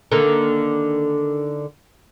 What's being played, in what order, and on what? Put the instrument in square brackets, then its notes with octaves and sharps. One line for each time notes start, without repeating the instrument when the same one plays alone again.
[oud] D3 D#3 A#3